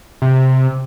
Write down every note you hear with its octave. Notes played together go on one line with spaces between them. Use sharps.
C3